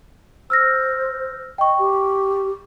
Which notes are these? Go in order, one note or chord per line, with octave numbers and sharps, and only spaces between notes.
C5 E6 F6 A#6
D#5 G5 C#6
G4